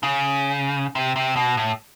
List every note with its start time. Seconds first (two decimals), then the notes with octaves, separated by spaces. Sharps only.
0.03 C#3
0.95 C3
1.16 C3
1.36 B2
1.57 A2